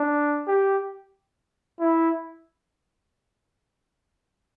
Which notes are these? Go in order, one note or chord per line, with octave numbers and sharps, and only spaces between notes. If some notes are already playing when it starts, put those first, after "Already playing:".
Already playing: D4
G4
E4